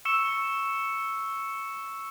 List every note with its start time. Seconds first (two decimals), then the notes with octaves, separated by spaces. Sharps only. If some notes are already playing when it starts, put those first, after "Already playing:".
0.05 C#6 E6 C#7 E7